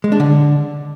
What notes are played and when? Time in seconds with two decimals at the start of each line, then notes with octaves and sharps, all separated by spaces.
0.04 G#3
0.12 D4
0.20 D3